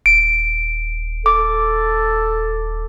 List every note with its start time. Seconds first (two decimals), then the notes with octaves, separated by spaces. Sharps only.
0.06 D#1 D7
1.26 A4 D6